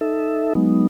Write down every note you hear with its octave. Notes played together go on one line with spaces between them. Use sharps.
D#4 A4 E5
F#3 G#3 B3 D#4